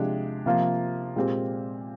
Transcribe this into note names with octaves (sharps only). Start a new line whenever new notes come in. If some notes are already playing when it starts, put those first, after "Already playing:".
Already playing: C3 F3 G#3 D4 G4
C3 F3 A#3 F4
A#2 G#3 C4 G4